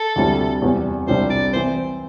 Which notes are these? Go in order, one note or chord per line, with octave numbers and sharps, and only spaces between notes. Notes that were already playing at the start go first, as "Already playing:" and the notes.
Already playing: A4
D2 C3 G3 E4
E2 C3 G3
C2 C3 G3 D4 C5
D5
E3 C4 C5